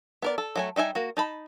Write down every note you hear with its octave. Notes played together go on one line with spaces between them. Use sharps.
B3 A#4 D5
A4
F#3 A3 G#5
G3 D#4 E5 G#5
A#3 F#4
D#4 A5 B5